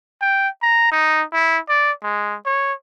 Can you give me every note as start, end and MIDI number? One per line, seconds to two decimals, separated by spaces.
0.21 0.48 79
0.62 0.89 82
0.92 1.23 63
1.33 1.58 64
1.69 1.91 74
2.03 2.35 56
2.46 2.73 73